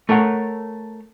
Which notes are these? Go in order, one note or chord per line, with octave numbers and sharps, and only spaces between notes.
A3 A#4 C#5 F#5